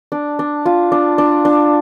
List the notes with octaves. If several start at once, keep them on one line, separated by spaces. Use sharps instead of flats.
D4
D4
F4
D4
D4
D4